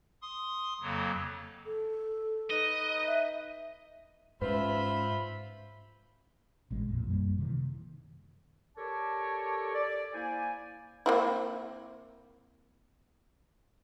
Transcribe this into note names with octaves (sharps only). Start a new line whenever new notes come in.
C6 D#6
F2 C#3 F#3 A#3
A4
D#4 B4 D#5
E5
G#2 C#4 F4 B4 C5 E5 B5
A1 B2 G#3
B1 F2 A#2
F#2 G3 A#3
C3 D#3 E3
G4 A4 A#4 C#5 D5 A5
D5
A#3 E4 C5 D5 G#5
A#3 C4 E4